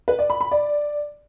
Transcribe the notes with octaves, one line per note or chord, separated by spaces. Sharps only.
B4
D5
B5
B5
D5